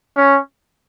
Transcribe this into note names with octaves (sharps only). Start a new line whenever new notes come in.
C#4